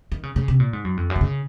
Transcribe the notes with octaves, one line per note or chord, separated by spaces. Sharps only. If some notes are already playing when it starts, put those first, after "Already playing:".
D#3
C#3
C#3
C3
A#2
G#2
F#2
F2
F#2
D#3
C#3